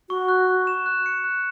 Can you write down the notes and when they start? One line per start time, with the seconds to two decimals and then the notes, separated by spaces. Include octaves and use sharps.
0.09 F#4 C#6
0.28 F#6
0.48 C#6
0.67 E7
0.86 F#6
1.06 C#7
1.24 F#6